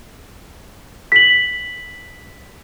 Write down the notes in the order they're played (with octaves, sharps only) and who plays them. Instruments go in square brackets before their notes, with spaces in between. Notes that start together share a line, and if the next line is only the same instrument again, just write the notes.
[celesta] B6 F#7